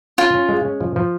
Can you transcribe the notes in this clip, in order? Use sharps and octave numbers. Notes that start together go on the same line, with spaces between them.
C#4 F4
C#4
G#3
C#4
F3
F3